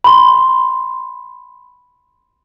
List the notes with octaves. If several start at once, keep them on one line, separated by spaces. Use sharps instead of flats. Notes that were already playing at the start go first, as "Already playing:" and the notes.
B5 C6